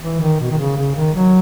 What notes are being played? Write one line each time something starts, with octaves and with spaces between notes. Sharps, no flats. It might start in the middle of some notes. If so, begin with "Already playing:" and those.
E3
D#3
B2
D#3
C#3
C#3
D#3
F#3